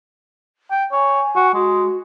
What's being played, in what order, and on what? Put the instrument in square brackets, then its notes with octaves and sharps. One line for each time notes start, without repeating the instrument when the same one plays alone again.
[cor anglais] G5
[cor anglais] C#5 [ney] G#5
[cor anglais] F#4
[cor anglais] G#3 [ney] F#4